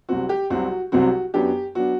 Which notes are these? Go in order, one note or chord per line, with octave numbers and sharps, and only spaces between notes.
C2 C3 F#3 C4 F#4
G4
C2 C3 F#3 C4 F#4
C2 C3 F#3 C4 F#4
F#2 F#3 B3 D4 G4
F#3 B3 D4 F#4